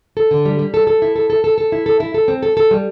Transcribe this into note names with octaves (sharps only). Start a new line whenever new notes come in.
A4
D3
G3
G3
A4
A4
E4
A4
A4
A4
A4
E4
A4
E4
A4
C4
A4
A4
G3